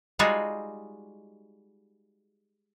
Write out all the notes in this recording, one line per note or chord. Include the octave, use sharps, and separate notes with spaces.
G3 G#3 D#4 F4 F#4 G#4